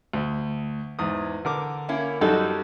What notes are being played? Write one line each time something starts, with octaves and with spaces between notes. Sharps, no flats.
D2
E2 G#2 D#6
D3 A#4 D6
A#3 C#4 E4
F#2 G3 D#4 F#4 A4